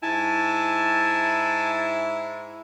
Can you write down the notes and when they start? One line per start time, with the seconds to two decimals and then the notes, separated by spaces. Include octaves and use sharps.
0.02 G#2 E4 G#5 A5